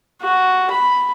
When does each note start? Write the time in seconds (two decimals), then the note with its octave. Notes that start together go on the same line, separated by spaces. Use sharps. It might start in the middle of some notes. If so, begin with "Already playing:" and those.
0.22 F#4
0.71 B5